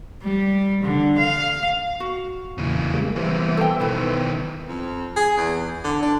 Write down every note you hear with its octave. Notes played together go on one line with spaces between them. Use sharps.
G3
D3
F5
F#4
E2 A#2 C#3 E3
G3 G#3 A#3
E3 G3 B3 C5 E5
A4 G5
B2 D#3 E4 B4
F2
G#4
E2
D3
D4